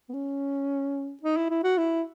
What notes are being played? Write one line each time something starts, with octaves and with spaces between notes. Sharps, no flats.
B3
C#4
D#4
E4
E4
F#4
E4